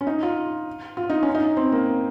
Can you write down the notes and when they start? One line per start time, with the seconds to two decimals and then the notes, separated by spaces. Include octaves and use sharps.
0.01 C#4
0.07 D#4
0.23 F4
0.97 F4
1.10 D#4
1.23 C#4
1.35 D#4
1.57 C4
1.72 A#3